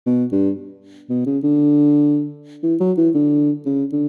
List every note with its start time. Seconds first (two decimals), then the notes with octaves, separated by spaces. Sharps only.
0.06 B2
0.32 G2
1.10 B2
1.26 C#3
1.43 D3
2.63 E3
2.80 F#3
2.97 E3
3.15 D3
3.66 C#3
3.92 D3